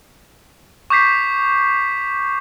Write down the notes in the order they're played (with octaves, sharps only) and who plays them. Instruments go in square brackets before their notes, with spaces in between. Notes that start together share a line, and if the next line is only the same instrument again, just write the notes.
[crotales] C#6 D6 G6 B6 C7